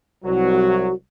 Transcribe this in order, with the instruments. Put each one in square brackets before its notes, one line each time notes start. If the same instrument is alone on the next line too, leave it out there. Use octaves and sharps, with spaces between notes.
[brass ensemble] C2 F#3 [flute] F#4